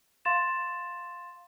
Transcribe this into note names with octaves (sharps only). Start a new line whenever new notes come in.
F5 C6 A6 E7